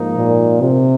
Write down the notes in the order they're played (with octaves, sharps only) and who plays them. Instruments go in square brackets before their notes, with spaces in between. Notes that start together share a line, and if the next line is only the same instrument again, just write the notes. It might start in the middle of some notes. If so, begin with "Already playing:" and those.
Already playing: [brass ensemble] G#2 F3 A#3 D#4
[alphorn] A#2
C3